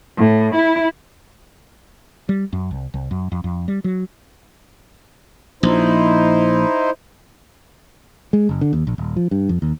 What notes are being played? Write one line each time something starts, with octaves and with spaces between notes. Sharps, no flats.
A2
E4
G3
F#2
C2
C2
F#2
F2
F2
G3
F#3
A#1 D#4 E4 C5
G#3
F#1
D3
D#2
A#1
D#1
F3
G2
F2
D#2